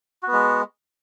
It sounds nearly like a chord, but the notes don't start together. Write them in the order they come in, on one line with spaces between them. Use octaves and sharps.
F#4 B3 G#3